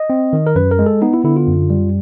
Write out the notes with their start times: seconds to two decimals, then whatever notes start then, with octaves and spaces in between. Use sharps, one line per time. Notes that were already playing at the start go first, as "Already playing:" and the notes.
Already playing: D#5
0.10 C4
0.33 D#3
0.47 A#4
0.56 F#2 B4
0.71 A#4
0.79 G#3
0.86 A4
1.02 B3 D#4
1.14 E4
1.24 D3 E4
1.37 F4
1.47 F#2
1.70 G3